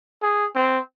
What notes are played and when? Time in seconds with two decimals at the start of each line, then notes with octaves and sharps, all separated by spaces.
0.22 G#4
0.55 C4